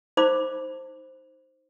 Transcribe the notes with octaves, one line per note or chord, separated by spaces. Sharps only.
D#4 C5 B5 D6